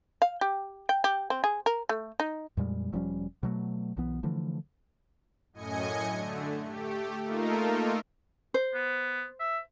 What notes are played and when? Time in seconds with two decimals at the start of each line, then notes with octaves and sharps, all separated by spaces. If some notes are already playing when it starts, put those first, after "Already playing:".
0.22 F5
0.41 G4
0.89 G5
1.04 G4
1.30 C4
1.44 G#4
1.66 A#4
1.89 A3
2.20 D#4
2.57 F2 A#2 G3 G#3
2.93 E1 F3 G3 C#4
3.43 B2 F#3 A3
3.97 B1 E3 B3
4.23 D3 E3 F3 A3
5.53 F#2 A2 D#5 G#5 C#7
6.11 D3 A3
6.65 A3 G4
7.25 A3 A#3 D#4 F4 A4 A#4
8.54 C5
8.74 B3
9.40 E5